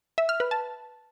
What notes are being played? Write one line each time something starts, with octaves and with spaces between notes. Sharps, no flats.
E5
F6
B4
A5